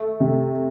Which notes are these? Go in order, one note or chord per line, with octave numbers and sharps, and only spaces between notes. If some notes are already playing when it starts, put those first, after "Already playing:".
Already playing: A3
C3